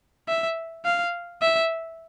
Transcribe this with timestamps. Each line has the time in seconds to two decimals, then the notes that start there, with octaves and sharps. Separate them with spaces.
0.28 E5
0.85 F5
1.42 E5